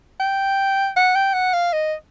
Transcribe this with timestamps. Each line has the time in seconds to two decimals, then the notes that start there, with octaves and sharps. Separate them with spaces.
0.20 G5
0.96 F#5
1.15 G5
1.33 F#5
1.53 F5
1.73 D#5